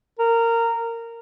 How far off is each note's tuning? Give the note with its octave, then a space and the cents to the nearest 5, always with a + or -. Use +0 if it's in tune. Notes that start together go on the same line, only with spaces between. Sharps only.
A#4 -15